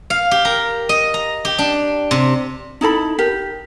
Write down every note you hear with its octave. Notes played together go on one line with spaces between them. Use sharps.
F5
G4
A#4
D#5
A#5
G4
D4
C3
D#4 E4 A4 B5
G4 A#4